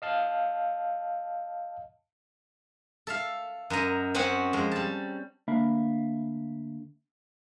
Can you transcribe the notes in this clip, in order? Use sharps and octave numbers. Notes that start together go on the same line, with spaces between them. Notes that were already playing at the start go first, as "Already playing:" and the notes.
D#5 F5 A5
A4 E5 F5
F#2 D#5 A#5
C4 C#4 F#4 D#5 F#5 G#5
F2 G#3
G3 A5
D2 A#3 D4 E5 F5 B5